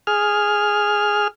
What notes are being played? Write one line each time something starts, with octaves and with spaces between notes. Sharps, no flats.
G#4 F6